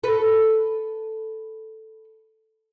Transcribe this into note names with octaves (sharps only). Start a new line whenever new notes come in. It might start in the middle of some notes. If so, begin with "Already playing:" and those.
A4 B4